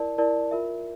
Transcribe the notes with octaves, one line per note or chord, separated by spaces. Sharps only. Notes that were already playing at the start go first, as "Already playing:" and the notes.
Already playing: E4 A#4 D5 A5
E4 A#4 D5 A5
F4 A#4 E5